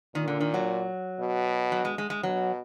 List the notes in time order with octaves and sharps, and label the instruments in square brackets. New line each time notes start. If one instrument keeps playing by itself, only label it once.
[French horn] A#2 [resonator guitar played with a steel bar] D#3
[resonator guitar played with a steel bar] D3
D#3
F#3
[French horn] B2
[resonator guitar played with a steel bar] F#3
G#3
G#3
G#3
[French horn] B2 [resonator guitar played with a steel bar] F#3